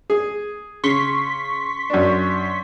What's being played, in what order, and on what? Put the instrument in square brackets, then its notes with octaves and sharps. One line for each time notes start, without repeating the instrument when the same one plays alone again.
[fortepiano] G#4
[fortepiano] C#3 [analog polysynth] C6 C#6 B6
[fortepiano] F#2 D4